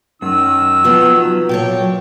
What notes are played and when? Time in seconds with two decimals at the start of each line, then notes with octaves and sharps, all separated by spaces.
0.22 F#2 D#3 E6
0.84 F3 F#3 B3
1.49 A#2 A4 C#5 G5